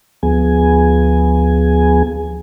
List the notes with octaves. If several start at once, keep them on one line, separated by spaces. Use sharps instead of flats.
D2 F3 B3 G#4 G#5